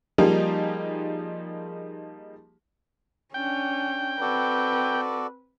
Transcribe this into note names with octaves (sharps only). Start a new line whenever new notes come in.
F3 G3 A#3 D#4 G4 G#4
C#4 D4 G5
C4 F#4 A4 B4 D5